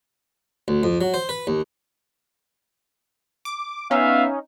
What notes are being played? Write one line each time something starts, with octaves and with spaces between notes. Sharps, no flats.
D2
F2
F#3
C5
B4
D#2
D6
B3 C#4 D#4 E5 F5